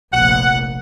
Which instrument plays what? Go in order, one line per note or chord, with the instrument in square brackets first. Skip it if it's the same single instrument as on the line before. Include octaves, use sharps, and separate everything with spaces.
[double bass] F1 A#1 [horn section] F#5